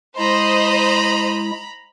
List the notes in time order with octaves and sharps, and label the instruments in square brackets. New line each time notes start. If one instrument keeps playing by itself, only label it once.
[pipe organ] G#3 E4 [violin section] C5 D#5 [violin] A#5 B5